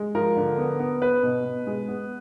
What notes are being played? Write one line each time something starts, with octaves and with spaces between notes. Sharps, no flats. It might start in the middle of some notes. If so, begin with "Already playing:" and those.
Already playing: G#3
F3 A#4
D3
B3
B3
B3 B4
B2
B2
G#3
B3